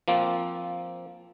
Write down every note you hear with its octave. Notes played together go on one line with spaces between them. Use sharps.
F3 A#3 C4